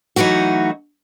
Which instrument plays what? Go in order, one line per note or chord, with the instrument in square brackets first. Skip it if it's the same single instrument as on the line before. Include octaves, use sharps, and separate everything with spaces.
[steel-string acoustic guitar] E3 F#3 A3 D#4 F#4